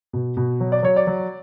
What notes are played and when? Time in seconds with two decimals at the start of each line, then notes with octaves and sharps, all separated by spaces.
0.13 B2
0.37 B2
0.60 F#3
0.72 D5
0.83 F#3 C#5
0.96 D5
1.07 F#3